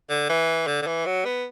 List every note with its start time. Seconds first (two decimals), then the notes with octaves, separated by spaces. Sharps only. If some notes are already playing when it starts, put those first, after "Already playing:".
0.10 D3
0.29 E3
0.67 D3
0.82 D3
0.87 E3
1.06 F#3
1.25 B3